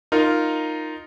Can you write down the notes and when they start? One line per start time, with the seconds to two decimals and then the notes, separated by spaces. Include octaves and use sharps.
0.12 D#4 F4 A#4